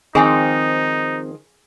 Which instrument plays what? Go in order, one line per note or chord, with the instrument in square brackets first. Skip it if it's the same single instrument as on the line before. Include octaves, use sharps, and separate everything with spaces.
[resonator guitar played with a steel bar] D#3 F3 G#3 [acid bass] C4 [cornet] D#4 [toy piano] G#4 G#5 D#6